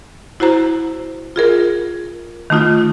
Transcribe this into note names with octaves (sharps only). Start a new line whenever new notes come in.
E4 F#4 C5 A#5
F4 G#4 A#4
D#3 A3 D#4 F4